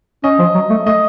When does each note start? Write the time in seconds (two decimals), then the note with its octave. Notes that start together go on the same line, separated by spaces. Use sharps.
0.24 C#4 D#5
0.39 F3
0.55 F#3
0.70 A3
0.86 A3 D#5